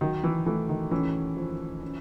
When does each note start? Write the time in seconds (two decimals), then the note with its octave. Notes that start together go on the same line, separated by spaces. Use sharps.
0.01 D#3 F#3
0.24 E3
0.46 E3 A3
0.69 D#3
0.91 E3 C#4
1.37 F3
1.82 C#4